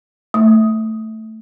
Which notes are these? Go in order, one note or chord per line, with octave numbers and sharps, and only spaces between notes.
A3